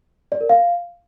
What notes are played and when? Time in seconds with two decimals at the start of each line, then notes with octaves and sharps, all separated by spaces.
0.32 D5
0.41 A#4
0.49 F5